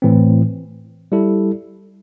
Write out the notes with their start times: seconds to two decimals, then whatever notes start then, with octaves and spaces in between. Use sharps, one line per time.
0.02 A2 E3 C4
1.12 G3 E4 A4